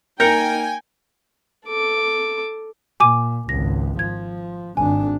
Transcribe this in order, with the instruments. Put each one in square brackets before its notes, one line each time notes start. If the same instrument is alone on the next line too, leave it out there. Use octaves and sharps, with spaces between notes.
[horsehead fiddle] A#3 D#4 [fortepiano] A#4 [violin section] G5 G#5 [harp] G6 A#6 C#7
[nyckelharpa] A4 D6
[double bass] A#2 [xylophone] G#5 D6 D#7
[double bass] G#1 C#2 [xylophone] A#6
[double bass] F3 [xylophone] G#6
[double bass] G#1 D4 [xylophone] G#5